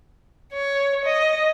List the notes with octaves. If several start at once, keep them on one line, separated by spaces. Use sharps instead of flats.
C#5
D#5